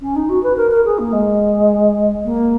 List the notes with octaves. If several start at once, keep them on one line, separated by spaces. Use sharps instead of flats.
C#4
D#4
F#4
B4
A#4
A#4
G#4
A#3
G#3
A#3